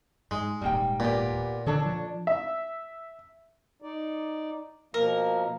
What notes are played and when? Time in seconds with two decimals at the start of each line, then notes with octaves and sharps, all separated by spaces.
0.31 G#2 G#3
0.61 D#1 G#2 G3 A#3 G5
1.00 A#2 B3 G4
1.66 D3 D4 A4 C#5
1.85 F3
2.27 E5
3.82 D#4 D5
4.94 B2 F3 A#3 A#4